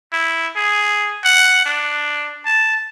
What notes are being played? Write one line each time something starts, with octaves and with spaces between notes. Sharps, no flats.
E4
G#4
F#5
D4
A5